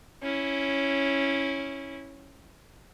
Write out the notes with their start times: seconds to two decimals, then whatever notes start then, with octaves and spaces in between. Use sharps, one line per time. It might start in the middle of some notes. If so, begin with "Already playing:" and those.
0.23 C#4 E4